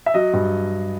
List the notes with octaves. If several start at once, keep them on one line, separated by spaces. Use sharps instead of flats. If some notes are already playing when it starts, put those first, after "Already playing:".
E5
F#3 D#5
G2